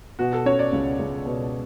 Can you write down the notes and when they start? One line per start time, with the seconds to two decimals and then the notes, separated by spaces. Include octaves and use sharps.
0.19 B2 F#4
0.33 A4
0.46 C#4 C#5
0.59 D5
0.72 C#2
0.99 C#2
1.26 B2